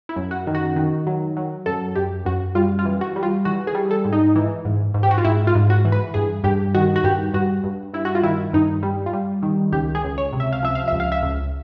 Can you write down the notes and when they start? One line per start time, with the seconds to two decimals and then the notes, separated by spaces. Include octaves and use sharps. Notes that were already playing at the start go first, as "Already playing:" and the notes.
0.09 E4
0.16 F#2
0.31 F#4
0.47 D#3
0.55 F#4
0.76 D#3
1.07 F#3
1.37 F#3
1.66 F#2 A4
1.95 F#2 G4
2.25 F#2 F#4
2.55 G3 F4
2.79 F4
2.85 E3
3.01 F#4
3.16 G3
3.23 F4
3.45 E3 F#4
3.67 G#4
3.75 G3
3.91 A4
4.05 G#2
4.12 D#4
4.36 E3
4.65 G#2
4.94 G#2
5.03 G4
5.11 F#4
5.18 F4
5.24 G#2 E4
5.47 F4
5.55 G#2
5.70 F#4
5.85 E3
5.92 B4
6.14 G2 G#4
6.44 G2 G4
6.75 D#3 F#4
6.96 F#4
7.03 G2 G4
7.34 G2 F#4
7.64 G2
7.94 G2 E4
8.05 F#4
8.15 F4
8.23 D#3 E4
8.53 G2 D#4
8.83 G3
9.06 F4
9.13 G3
9.43 D#3
9.72 C#2 G4
9.95 G#4
10.03 C#2
10.18 C#5
10.33 C3
10.40 E5
10.53 F5
10.63 F3 E5
10.75 F5
10.88 C#2 E5
11.00 F5
11.12 E5
11.23 C#2